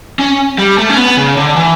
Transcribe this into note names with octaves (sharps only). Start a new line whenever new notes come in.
C#4
G3
A3
C#4
B3
C#3
D3
E3